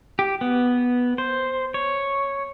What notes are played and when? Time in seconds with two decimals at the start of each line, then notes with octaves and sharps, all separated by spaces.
0.19 G4
0.41 B3
1.18 C5
1.74 C#5